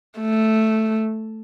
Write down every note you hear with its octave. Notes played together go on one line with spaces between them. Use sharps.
A3